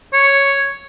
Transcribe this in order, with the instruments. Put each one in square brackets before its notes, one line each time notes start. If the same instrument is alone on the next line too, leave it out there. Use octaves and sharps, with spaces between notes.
[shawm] C#5